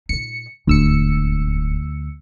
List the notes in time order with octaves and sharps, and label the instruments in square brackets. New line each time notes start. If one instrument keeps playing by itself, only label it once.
[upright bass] A#2 D#4 [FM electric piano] C#7
[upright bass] D#1 G#1 [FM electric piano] D2 E6 C#7